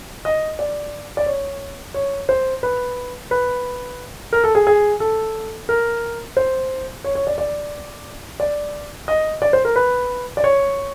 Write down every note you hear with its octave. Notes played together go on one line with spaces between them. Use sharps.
D#5
D5
D5
C#5
C#5
C5
B4
B4
A#4
A4
G#4
G#4
A4
A#4
C5
C#5
C#5
D5
D5
D5
D#5
D5
C5
A#4
B4
D5
C#5